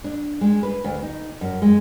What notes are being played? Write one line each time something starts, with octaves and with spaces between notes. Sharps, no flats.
D4
G#3
B4
D2
D#4
F#2
G#3